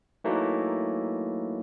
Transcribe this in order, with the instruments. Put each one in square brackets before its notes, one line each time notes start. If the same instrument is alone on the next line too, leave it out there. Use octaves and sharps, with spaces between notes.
[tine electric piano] E3 F#3 A3 A#3 D#4